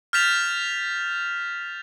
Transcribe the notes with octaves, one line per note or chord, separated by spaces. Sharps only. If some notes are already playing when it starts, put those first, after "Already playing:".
F6 G6 A6 B6 E7 F7